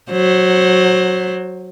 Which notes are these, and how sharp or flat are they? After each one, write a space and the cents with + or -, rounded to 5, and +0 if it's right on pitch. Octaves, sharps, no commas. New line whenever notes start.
F#3 +0 C5 +20